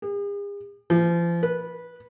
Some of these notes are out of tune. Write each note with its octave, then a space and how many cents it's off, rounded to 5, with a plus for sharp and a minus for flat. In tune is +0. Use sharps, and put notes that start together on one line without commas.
G#4 -45
F3 -40
B4 -15